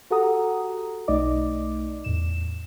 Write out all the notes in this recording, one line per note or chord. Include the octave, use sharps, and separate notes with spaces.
F#4 G4 A4 F#5 A#5 D#6
B1 A3 D#4 D5 D#5 D6
E2 A2 E7